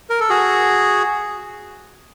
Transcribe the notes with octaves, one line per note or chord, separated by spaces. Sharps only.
A#4
A4
F#4 G#4